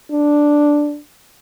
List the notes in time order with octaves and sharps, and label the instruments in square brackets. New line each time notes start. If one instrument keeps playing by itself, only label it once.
[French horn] D4